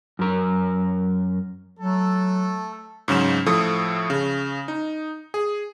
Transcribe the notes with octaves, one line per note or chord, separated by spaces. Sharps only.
F#2 A#4
F#3 A3 A4
G#2 C#3 F#3 C#4 E7
A2 F3 A4 D#6
C#3
D#4
G#4